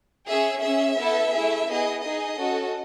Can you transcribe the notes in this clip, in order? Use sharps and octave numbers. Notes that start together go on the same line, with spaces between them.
C#4 G#4 E5
C#4 G#4 E5
B3 E4 A4
A3 E4 G#4
B3 E4 G#4 D#5
D#4 G#4 D#5
C#4 F#4 A4